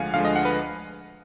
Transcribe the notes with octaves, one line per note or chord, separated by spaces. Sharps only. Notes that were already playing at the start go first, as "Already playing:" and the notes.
Already playing: D2 D3 F3 G#3 F5 F#5 G#5
D2 D3 F3 G#3 F5
D#5
F#5
B4